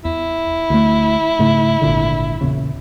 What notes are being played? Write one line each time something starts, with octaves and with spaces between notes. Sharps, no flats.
E2 E4
D2 A3
G#2 C#3 A3
G#1 A#2 D3
E2 A#2 C#3